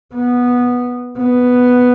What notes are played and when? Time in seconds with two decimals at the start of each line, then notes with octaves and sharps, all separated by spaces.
0.14 B3
1.18 B3